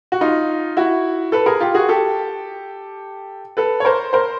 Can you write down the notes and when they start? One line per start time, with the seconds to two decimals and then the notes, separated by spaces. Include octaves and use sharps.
0.12 F#4
0.21 D#4 F4
0.77 E4 F#4
1.32 A4 B4
1.46 G#4 A#4
1.60 F4 G4
1.75 F#4 G#4
1.89 G4 A4
3.57 A4 B4
3.80 C#5
3.85 A#4 C5
4.13 A#4 C5